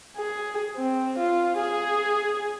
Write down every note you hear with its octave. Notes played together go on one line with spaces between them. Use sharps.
G#4
C4
F4
G#4